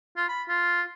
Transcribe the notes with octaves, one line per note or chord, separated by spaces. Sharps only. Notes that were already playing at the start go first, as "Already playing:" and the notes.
F4
B5
F4